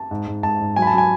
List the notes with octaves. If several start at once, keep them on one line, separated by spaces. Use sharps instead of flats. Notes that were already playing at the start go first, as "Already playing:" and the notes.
Already playing: A5
G#2
G#2
G#2 A5
G#2
F#3 G#5
B5
A5
F#3 G#5